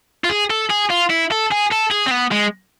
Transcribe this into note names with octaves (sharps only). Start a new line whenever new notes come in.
F4
G#4
A4
G#4
F4
E4
A4
G#4
A4
G#4
C4
B3
G#3